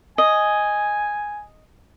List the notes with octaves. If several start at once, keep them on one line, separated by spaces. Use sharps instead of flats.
D#5 G#5